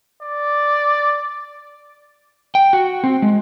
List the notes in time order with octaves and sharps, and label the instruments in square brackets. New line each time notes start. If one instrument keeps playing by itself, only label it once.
[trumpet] D5
[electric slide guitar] G5
F#4
C4
G#3